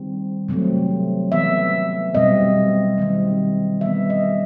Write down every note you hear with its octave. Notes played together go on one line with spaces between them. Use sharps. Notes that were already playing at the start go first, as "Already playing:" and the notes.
Already playing: D#3 G3 C4
C3 F#3 A3 C4
E3 B3 E5
B2 G3 C4 D#5
D#3 G3 C4
E3 G3 B3 E5
D#5